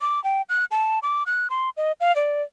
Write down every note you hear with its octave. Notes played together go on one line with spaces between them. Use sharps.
D6
G5
F#6
A5
D6
F#6
C6
D#5
F5
D5